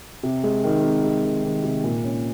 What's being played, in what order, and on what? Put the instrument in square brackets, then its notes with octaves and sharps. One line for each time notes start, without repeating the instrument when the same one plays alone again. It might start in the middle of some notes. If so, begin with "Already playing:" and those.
[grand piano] C3
G#3
D#3
C3
G#3
D#3
D#3
C3
A#2
C#4